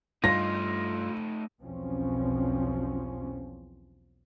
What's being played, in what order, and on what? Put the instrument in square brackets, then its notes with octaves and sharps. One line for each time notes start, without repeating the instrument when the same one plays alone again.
[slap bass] G2 G3 [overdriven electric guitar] A3 D#4 [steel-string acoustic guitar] F4 [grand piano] A#6
[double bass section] B1 E2 B2 F3 C4 C#4